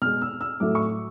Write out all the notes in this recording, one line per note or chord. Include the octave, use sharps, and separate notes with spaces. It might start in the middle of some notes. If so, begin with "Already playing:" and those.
B2 G#3 F6
E6
E6
A2 F#3 A3 D6
C#6